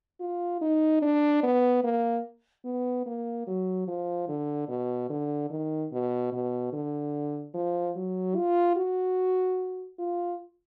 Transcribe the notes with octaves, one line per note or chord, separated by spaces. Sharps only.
F4
D#4
D4
B3
A#3
B3
A#3
F#3
F3
D3
B2
D3
D#3
B2
B2
D3
F3
F#3
F4
F#4
F4